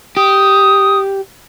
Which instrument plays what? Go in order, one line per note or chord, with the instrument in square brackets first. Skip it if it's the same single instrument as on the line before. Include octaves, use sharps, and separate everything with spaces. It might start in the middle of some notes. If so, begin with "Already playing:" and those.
[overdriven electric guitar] G4 [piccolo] D#6